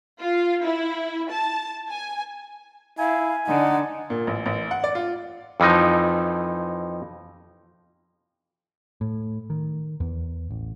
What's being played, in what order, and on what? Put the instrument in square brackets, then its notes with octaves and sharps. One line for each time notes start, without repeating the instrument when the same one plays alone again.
[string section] F4
E4
A5
G#5
[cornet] E4 [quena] F5 [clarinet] G#5
[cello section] D3 [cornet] D#4 [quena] F#5
[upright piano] A#2
A1
A1
F#5
D5
F4
[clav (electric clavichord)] F2 E3 F3 D#4
[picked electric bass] A2
D#3
E2
A1